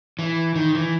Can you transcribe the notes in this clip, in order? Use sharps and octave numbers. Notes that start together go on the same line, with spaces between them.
E3
D#3
E3